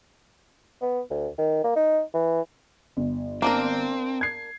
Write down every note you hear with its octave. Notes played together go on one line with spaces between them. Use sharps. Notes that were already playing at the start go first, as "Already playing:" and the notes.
B3
D2
D#3
A#3
D#4
E3
G1
A#3 C4 D4 A#4
G#6 C7